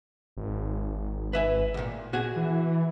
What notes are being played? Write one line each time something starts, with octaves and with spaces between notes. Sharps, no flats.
G#1
B4 E5 G#5
D2 A#2
F#4 G#4 G#5
E3